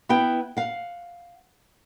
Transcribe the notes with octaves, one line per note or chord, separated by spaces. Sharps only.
B3 E4 F#5 G5
F5 F#5